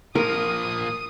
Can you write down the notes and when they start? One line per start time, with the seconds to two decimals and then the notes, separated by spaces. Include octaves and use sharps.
0.15 F3 A#3 A#4 D#6